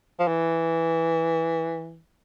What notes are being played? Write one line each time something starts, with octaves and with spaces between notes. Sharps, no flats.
F3
E3